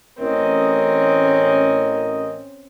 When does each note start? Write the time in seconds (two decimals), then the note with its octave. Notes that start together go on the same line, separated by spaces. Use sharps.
0.19 A1 C4 C#4 A#4 D#5